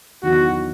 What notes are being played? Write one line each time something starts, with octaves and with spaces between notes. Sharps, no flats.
E2 D#3 F#3 F#4